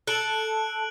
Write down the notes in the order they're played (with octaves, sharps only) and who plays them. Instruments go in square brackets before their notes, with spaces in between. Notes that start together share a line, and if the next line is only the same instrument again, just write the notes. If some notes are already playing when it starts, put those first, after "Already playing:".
[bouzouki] A4 [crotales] F#6 D7 F#7